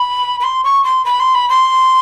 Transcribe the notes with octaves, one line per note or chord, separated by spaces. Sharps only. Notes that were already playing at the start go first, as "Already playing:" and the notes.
Already playing: B5
B5
C6
C#6
C6
B5
C6
B5
C6